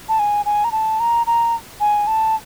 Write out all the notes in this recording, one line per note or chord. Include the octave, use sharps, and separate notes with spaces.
A5
G#5
G#5
A#5
A5
A#5
A#5
G#5
A5